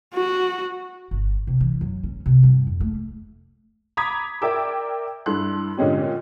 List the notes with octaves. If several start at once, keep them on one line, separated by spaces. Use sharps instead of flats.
F#4
G1
C3
E3
F#2
C#4
C3
G2
F2
A3
A#5 B5 D6 D#6 G#6 B6
A#4 D5 E5 G5 D6 E6
G2 E4 A4 C6 F#6
A#2 D3 G#3 C#4 G4